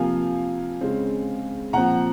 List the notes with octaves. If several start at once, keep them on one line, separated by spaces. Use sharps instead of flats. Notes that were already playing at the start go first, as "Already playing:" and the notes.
Already playing: C3 F3 A#3 F5 G#5
C#3 G#3 C4
A#2 F3 C4 F#5 A#5